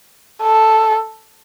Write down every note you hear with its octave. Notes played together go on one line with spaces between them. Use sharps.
A4